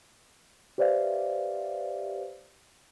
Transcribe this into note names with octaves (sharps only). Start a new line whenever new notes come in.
G4 B4 C5 D5 E5 F5